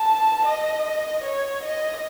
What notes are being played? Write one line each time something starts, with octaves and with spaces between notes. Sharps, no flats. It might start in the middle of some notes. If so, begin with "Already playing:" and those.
Already playing: A5
D#5
C#5
D#5